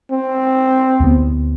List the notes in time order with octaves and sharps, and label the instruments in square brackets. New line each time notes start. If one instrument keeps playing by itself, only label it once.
[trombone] C4
[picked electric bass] D2 B3